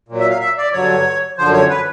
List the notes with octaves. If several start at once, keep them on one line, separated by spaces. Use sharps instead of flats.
A#2 F#3
E5
F5
E5
D5
G2 D3 F#3 C#5
F#2 D3 F3 C5
C#5
B4